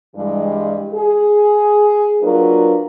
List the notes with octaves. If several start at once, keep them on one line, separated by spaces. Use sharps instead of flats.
G2 E3 G3 G#3
G#4
F#3 A#3 D4 F4 A#4 B4